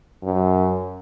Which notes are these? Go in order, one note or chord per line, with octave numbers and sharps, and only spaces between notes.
F#2